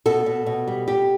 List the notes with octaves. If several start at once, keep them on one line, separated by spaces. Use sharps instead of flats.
B2 A4
B2
B2
G3
G3 G4